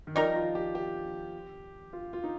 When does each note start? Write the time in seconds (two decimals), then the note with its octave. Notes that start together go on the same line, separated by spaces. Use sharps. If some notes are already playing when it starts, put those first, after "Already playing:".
0.07 D#3
0.15 F3 G3 D#4 A#4
0.35 F4
0.55 G4
0.75 G4
1.93 F4
2.13 F4
2.24 D#4